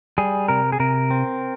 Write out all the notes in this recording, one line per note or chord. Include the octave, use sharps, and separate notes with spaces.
G3 G#4
C3 A#4
G#4
C3 A#4
C4